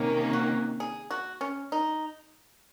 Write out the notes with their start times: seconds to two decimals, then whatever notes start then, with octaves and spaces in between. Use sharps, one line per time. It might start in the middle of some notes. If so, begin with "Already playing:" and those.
Already playing: C3 D#3 A#3 C#4
0.33 F#4
0.80 G#4
1.11 F#4
1.41 C#4
1.72 D#4